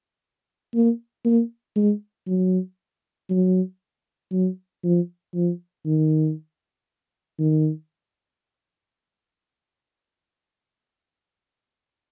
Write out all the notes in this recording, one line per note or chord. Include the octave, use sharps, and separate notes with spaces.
A#3
A#3
G#3
F#3
F#3
F#3
F3
F3
D#3
D#3